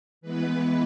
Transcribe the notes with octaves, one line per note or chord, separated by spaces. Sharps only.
E3 G#3 B3 B4